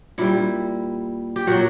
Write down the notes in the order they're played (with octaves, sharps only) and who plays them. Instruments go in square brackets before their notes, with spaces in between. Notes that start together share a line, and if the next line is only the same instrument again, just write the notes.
[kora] A#2 G3 E4
G4
A#2 F#3 F#4